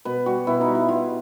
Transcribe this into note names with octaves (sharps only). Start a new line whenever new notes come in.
B2 B4
G3 F#4
B2 E4
D#4
G3
E4
B2 F4